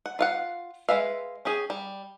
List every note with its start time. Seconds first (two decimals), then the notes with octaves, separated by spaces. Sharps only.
0.06 F#5
0.19 F4 F5 F#5
0.89 G#3 B4 E5 F5
1.45 C#4 G4 G#4
1.70 G3